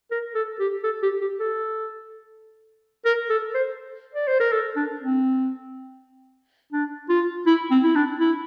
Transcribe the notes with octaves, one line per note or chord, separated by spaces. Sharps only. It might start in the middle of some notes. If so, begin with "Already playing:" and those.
A#4
A4
G4
A4
G4
G4
A4
A#4
A4
C5
D5
C5
A#4
A4
D4
C4
D4
F4
E4
C4
E4
D4
E4